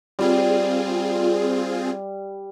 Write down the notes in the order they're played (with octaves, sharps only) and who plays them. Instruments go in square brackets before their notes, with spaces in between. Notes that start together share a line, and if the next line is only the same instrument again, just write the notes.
[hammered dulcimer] G3 [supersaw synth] C4 F4 G#4